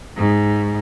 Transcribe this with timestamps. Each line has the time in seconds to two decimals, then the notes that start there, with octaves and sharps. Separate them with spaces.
0.17 G#2